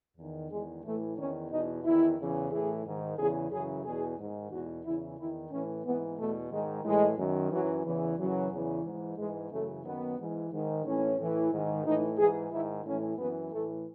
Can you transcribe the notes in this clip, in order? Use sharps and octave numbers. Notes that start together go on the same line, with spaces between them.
E2 D#3
E2 D#3 G#3
A2 E3 A3
E2 D#3 C#4
E2 B2 D#4
E2 D#3 E4
E2 C#3 E3
A2 E3 G#4
G#2 D#3
E2 C#3 E3 G#4
F#2 C#3 E3 G#4
E2 B2 G#4
G#2 D#3
E2 B2 F#4
E2 C#3 E3 E4
E2 D#3 E4
A2 E3 C#4
G#2 E3 B3
E2 B2 A3
G#2 D#3 G#3
A2 E3 G#3
F#2 D#3
F#2 E3 F#3
E2 C#3 E3
F#2 C#3 E3 F#3
E2 C#3 E3
G#2 E3
G#2 E3 G#3
F#2 C#3 E3 A3
F#2 D#3 B3
G#2 E3
G#2 D#3
A2 E3 C#4
A2 E3
G#2 D#3
A2 E3 D#4
G#2 E3 G#4
G#2 D#3 E4
A2 E3 C#4
F#2 E3 B3
A2 E3 A3